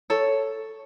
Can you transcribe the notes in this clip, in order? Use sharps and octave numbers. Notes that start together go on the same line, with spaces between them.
A4 C#5